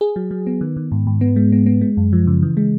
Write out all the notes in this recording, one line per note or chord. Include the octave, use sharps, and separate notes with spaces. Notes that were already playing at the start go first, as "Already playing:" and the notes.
G#4
F#3
F#3
B3
D#3
D#3
G#2
G#2
B3
G#3
B3
B3
G#3
F#2
F3
C#3
E3
G#3